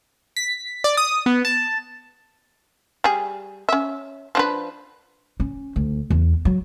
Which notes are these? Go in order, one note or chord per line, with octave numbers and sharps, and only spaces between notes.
B6
D5
D#6
B3
A5
G3 G#4
C#4 E5
F3 D4 B4
C#4
D2
E2
F#3